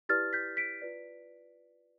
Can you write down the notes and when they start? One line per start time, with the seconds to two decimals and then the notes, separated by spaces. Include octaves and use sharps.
0.09 E4 G4 B4 D5 F6 A6
0.33 G6 B6
0.57 B6 D7
0.81 F4 B4 D5